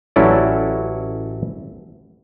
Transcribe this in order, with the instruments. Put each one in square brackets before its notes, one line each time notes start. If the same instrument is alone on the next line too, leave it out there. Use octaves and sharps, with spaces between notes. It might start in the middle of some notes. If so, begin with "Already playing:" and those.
[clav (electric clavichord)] A1 F#3 C#4 E4 A4 D5